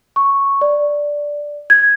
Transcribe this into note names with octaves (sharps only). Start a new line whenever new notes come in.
C#6
D5
G#6